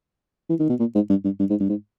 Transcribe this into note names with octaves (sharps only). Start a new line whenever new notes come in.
E3
D#3
B2
A#2
G#2
G2
G2
G2
G#2
G2
G#2